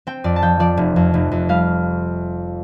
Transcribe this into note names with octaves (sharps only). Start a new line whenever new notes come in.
C4 G5
F2 D5
A5
F3 G5
F3 D5
F1
F2
F1
F2
G3 F5